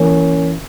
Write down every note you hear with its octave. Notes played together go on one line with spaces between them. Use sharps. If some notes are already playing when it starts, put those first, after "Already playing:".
Already playing: E3 A#3 C#4